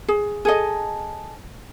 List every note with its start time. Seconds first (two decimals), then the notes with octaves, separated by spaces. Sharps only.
0.08 G#4
0.45 G#4 A4 D#5